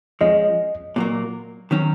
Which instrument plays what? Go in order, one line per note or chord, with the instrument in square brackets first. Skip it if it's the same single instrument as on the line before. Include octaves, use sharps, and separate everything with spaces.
[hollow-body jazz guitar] F3 G#3 C#4 [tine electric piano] D#5
[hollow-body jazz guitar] A#2 F#3 A#3
D#3 F#3 C#4